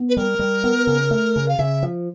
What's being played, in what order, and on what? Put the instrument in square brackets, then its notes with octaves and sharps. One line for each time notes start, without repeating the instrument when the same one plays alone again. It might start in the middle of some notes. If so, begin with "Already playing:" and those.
Already playing: [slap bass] B3
[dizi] B4
[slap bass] G3 [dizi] A#4
[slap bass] G3
B3
C#3
A3
C#3
[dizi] F5
[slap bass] C#3 [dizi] E5
[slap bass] F3